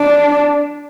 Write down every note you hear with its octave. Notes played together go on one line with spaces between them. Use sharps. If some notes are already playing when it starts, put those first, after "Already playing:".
Already playing: D4